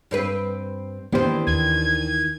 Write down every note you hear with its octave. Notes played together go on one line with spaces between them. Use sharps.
G2 C4 B4
D#3 E3 A#3 B3 D4 G4 C5
D#2 G#6